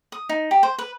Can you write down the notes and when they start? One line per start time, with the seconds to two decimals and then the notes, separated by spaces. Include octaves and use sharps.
0.12 D#6
0.29 D#4
0.51 G4
0.63 C5
0.78 B4